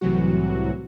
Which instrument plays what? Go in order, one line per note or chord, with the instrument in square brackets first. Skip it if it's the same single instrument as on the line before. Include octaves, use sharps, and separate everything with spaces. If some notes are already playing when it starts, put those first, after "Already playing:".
[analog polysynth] C2 A2 C3 E3 F#3 F#4